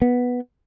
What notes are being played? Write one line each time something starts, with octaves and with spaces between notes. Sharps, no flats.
B3